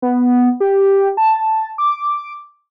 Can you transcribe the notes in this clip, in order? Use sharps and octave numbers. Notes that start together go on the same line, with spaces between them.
B3
G4
A5
D6